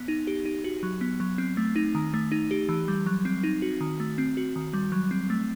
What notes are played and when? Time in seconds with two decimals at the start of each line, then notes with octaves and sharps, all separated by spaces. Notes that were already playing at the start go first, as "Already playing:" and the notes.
Already playing: B3
0.08 D#4
0.27 G4
0.45 D#4
0.64 F#4
0.83 F#3
1.01 B3
1.20 F#3
1.38 C4
1.57 A3
1.76 D#4
1.95 D#3
2.14 A3
2.32 D#4
2.51 G4
2.69 E3
2.88 G3
3.06 F#3
3.25 C4
3.43 D#4
3.62 F#4
3.81 D#3
4.00 A3
4.18 C4
4.37 F#4
4.56 D#3
4.73 G3
4.92 F#3
5.11 C4
5.30 A3